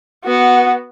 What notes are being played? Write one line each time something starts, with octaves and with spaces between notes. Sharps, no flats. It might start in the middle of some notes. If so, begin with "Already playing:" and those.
B3 F#4